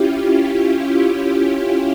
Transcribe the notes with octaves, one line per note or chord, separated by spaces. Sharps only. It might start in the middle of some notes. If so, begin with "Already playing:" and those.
Already playing: C#4 E4 F4 G4
C#4 F4